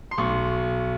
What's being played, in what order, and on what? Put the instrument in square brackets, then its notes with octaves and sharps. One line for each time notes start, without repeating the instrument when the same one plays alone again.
[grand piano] C6
B1 C#6